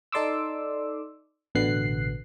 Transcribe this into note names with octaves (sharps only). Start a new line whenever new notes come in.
D#4 A4 D5 C6 D6 E6
A1 B2 D3 B3 F#6 C7